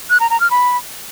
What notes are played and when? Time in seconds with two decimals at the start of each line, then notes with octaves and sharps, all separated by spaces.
0.10 F#6
0.20 A#5
0.30 A#5
0.40 F6
0.51 B5